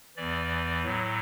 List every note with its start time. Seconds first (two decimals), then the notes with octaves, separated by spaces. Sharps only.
0.17 E2 E3 D5
0.85 A2 F#3